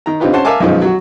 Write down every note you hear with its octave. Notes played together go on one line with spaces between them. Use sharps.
D#3 A#5
D3 C4 D#4 F4 G4 B4
C#4 C5 F#5 A5
A#4 E5 F5 G#5 A5 D6
B1 F#2 D#3 F3 G#3
F#3 F#4